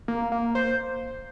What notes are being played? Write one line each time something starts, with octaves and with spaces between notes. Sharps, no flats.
A#3
A#3
C5